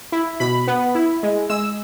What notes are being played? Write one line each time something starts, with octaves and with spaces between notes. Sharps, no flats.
E4
B2 B5
B3
E4
G#3
G#3 E6